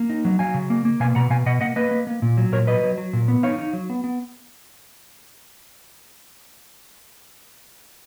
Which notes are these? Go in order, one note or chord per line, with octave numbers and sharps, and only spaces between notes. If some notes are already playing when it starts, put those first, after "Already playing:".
Already playing: A#3
D#4
F#3
F#3 F5 G#5
C#3
A#3
A#3
B2 F5 G#5
B2 F#5 A#5
B2 F5 G#5
B2 D#5 F#5
A#3 D#5 F#5
A#3 B4 D#5
A#3
A#3
A#2
F#3
A#2 A#4 C#5
F#3 B4 D#5
F#3
F#3
A#2
B3
D#4 C#5 F5
D#4
F#3
B3
B3